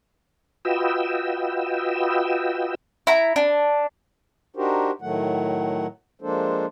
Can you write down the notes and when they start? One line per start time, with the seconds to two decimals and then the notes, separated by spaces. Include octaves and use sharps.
0.65 F4 F#4 B4 D#5 G5 E6
3.07 E4 A#5
3.36 D4
4.56 D4 D#4 F#4 G4 A#4 C5
5.02 A2 D#3 F#3 A3 F#5
6.22 F3 G#3 A#3 D4 A4 C5